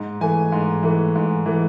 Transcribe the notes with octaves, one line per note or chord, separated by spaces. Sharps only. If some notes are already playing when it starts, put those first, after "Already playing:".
Already playing: G#2
E3 A3 G#5
G#2
E3 A3
G#2
E3 A3